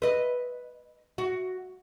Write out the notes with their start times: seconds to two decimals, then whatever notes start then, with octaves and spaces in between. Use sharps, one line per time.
0.02 B4 D#5
1.18 F#4